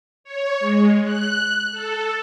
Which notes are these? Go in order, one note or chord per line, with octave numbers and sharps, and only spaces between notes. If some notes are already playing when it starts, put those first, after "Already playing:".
C#5
G#3
F#6
A4